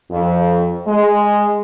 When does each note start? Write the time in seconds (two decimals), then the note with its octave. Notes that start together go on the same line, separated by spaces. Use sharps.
0.10 F2
0.86 G#3